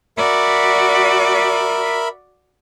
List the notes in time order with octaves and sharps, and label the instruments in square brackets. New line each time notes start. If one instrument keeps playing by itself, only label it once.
[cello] F#4 D5 [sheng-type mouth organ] A#4 E5 B5